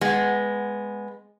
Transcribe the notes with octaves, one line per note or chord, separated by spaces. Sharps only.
G#3 B3